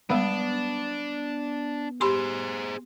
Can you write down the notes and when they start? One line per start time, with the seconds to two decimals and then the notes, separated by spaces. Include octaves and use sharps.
0.10 G3 G#3 B3 D4
2.01 G4 G#4 C5 B5 C6